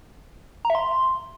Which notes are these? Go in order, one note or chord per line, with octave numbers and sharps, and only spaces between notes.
A#5
E5
C6